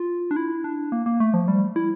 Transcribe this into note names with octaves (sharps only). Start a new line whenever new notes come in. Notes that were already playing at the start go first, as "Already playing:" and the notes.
Already playing: F4
D4
E4
D4
A#3
A#3
A3
F3
G3
E4